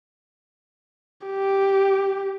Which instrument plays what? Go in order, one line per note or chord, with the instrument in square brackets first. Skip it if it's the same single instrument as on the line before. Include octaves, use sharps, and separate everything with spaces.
[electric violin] G4